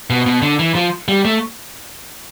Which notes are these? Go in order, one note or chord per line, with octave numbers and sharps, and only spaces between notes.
B2
B2
D3
E3
F3
G3
A3